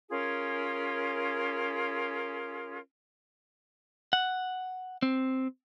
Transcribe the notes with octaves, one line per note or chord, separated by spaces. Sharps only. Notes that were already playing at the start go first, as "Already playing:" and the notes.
C#4 F4 G#4 A#4
F#5
C4